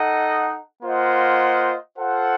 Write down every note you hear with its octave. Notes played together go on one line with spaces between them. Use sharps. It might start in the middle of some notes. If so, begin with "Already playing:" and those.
Already playing: D#4 A4 D#5 F#5
A#3 F4 C5 D#5 F#5
F4 A4 C5 F#5